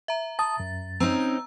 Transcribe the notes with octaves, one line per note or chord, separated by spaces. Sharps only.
E5 A#5
A5 D#6 A6
F#2
C4 C#4 D#4 A#5 E6